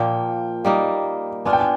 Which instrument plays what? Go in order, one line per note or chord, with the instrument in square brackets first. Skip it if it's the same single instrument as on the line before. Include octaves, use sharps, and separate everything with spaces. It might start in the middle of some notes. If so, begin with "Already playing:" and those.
Already playing: [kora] A#2 F3 A#3 [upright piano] G5
[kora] G3 A#3 D#4
[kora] B3 D4 F4 [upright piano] G#5
[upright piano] G5
G#5